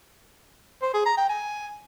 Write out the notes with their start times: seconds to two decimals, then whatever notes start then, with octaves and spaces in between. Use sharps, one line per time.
0.82 C5
0.94 G#4
1.06 A#5
1.17 G5
1.29 G#5